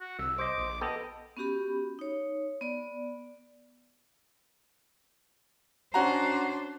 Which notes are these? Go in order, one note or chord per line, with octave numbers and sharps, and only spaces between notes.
F#4
C2 E6
C5 D#5 D6
A#1
B3 A4 D#5 G5
B3 C#4 F#4 G4 B5
D#4 C#5
B3 D5
C#4 D4 F#4 C5 A#5